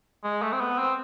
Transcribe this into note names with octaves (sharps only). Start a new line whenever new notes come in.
G#3
A3
C4
B3
C4